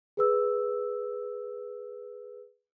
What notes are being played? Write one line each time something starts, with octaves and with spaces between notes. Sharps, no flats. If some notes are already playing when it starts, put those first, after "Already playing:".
G#4 B4 E6